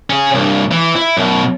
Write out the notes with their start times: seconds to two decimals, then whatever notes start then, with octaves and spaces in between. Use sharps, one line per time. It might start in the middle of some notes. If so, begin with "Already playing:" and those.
0.10 C#4 G#4
0.34 C2 G2
0.71 E3
0.96 E4
1.17 F#2 B2